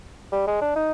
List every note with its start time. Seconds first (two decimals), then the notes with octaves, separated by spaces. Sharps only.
0.32 G3
0.47 G#3
0.61 D4
0.76 D#4